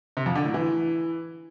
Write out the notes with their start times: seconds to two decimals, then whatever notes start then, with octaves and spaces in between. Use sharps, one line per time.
0.17 C3
0.26 F2
0.35 D3
0.45 A2
0.54 E3